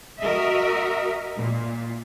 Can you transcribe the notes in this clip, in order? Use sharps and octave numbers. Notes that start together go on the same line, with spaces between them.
F#4 A#4 D#5 E5
A#2